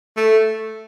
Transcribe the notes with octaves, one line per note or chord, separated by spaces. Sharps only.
A3